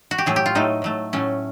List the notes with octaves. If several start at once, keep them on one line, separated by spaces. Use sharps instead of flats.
F#4
G4
A2 F#3 A3 G#4
G4
F4
A2 F#3 A3 D#4
A2 F#3 A3
A2 F#3 A3 C#4